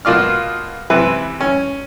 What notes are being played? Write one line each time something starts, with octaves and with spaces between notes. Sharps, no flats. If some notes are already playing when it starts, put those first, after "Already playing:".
B2 A#3 F4 D5 F6
C3 E3 B4 E5
C#4